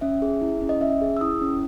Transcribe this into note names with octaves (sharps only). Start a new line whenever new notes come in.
C#4 E5
G#4
E4
C#4
D#5
C#4 E5
G#4
E6
E4 D#6
C#4